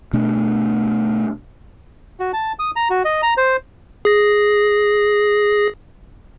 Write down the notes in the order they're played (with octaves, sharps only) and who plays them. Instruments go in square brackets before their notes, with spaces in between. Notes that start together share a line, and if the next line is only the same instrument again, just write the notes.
[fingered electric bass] B2 A3 D4
[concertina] F#4
A5
D#6
A#5
F#4
D#5
A#5
C5
[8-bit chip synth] G#4 A#6